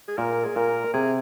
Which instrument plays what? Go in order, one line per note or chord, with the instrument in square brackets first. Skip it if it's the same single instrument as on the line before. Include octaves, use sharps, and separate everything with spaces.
[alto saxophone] G#4
[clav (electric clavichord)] A#2 [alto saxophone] A#4
[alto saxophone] G#4
[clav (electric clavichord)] A#2 [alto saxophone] A#4
[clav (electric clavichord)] C3 [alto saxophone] G#4